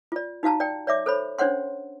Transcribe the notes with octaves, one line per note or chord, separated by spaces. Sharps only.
F4 D5
D#4 F#4 F5 A5 A#5
D5 G5
C#5 D5 E5 D6
A4 C5 C#5 B5
C#4 D4 C5 C#5 F#5 C6